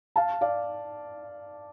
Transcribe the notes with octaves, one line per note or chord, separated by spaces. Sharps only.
F5 A5
D5 F5